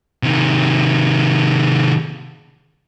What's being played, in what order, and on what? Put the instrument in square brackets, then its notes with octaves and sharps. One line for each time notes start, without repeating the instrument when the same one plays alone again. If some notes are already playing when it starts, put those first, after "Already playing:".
[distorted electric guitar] C3 D#3